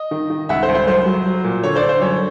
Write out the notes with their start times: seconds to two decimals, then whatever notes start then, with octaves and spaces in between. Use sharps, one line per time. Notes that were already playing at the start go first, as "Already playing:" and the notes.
Already playing: D#5
0.11 D#3
0.30 D#3
0.49 C#2 E5 F#5
0.63 C5
0.68 C#2
0.74 C5
0.87 F#2 C5
1.06 F#3
1.25 F#3
1.44 A#2
1.63 D3 C#5
1.76 C5 D5
1.82 D3
1.89 C5
2.01 F#2 C#5